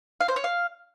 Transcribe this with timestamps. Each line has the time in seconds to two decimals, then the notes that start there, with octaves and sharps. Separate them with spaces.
0.21 F5
0.28 C5
0.36 C#5
0.44 F5